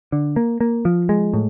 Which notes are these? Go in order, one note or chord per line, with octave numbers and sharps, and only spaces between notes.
D3
A#3
A#3
F3
G#3
A2